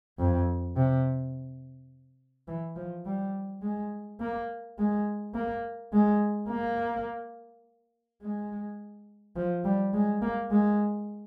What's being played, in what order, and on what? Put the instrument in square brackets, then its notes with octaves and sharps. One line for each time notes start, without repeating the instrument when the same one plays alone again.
[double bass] F2
C3
E3
F3
G3
G#3
A#3
G#3
A#3
G#3
A#3
G#3
F3
G3
G#3
A#3
G#3